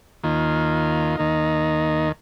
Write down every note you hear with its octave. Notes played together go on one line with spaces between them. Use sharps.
D#2 D#3 A#3 F4
D#2 D#3 A#3 D#4